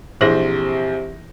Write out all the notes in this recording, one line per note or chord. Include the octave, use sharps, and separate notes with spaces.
A#1 C3 E3 E4 G#4 C5 A#6